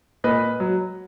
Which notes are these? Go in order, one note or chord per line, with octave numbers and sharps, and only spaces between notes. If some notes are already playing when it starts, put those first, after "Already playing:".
A#2 B4 D#5
F#3